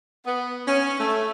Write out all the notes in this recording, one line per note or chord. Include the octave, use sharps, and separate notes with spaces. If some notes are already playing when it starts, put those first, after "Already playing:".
B3
C#4
A3